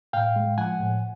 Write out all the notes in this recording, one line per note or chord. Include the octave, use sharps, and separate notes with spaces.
A2 F5 G5
G#3
F3 F#5 G#5
A2